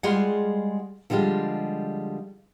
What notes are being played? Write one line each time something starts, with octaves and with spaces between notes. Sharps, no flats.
G3 G#3 F4 G#4 F#5
D3 F3 G3 G#3 F4